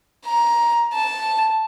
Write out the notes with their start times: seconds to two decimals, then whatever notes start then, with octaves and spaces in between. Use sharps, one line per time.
0.25 A#5
0.93 A5